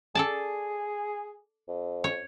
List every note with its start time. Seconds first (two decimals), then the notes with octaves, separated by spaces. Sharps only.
0.15 G#4 A4 D5 A5
1.68 F2
2.04 C#5